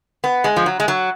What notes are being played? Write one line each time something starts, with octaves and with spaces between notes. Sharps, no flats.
B3
G#3
F3
F#3
G#3
F#3